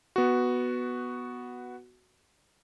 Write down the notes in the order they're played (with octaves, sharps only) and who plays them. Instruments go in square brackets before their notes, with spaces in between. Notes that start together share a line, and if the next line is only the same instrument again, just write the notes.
[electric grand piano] B3 F#4